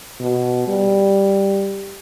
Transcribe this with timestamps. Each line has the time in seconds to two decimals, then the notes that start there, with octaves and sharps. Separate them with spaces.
0.20 B2
0.67 G3